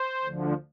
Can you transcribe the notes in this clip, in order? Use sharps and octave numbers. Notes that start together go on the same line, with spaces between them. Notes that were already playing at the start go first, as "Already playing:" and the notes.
Already playing: C5
D2 D3 F3